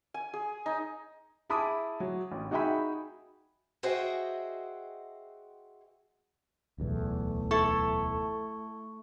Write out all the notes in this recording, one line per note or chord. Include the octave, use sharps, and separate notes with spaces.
G#5
G#4
D#4
E4 G#4 A5 B5 D6 D#6
F#3
A1
D#4 F#4 G#4 E5 G5 B5
F#4 G#4 C5 D#5 E5 G5
D1 B1 E2 A3
E4 A4 C#6